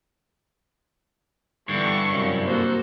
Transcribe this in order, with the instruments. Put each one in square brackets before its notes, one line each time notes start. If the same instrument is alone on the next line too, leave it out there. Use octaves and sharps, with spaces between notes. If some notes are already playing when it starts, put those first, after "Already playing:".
[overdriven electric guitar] G2 [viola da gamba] D3 E3 B3 [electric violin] C#6
[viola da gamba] F#2 C3 E4
[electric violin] A#3 F#4 [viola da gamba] A4 C5